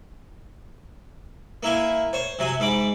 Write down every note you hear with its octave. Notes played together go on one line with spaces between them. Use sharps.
A#3 E4 G#5
C5 C#5
C3 F#3 G#5
G#2 B5 D6